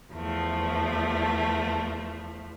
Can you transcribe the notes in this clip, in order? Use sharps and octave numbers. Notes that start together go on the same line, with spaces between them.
E2 F3 A3